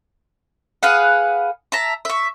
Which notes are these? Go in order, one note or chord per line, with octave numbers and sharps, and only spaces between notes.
G#4 B4 F5 F#5
E5 A5 A#5
E5 C#6